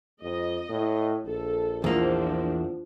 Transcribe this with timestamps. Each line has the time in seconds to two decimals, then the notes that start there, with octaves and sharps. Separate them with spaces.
0.22 F2 D#5
0.69 A2
1.26 A#1 A4
1.84 E2 F3 A#3 D4